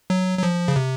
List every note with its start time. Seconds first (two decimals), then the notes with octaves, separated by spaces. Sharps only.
0.10 F#3
0.39 F#3
0.43 F3
0.68 C#3
0.76 C3